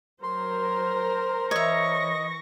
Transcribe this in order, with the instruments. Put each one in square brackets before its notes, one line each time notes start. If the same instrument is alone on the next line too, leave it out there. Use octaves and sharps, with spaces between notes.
[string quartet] F#3 [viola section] A#4 C5 A#5 [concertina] C6
[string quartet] E3 C#6 A#6 [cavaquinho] C#5 E5 [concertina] D#5